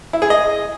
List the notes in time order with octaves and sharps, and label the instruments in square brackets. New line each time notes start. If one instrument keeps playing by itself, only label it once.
[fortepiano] E4
G#4
D#5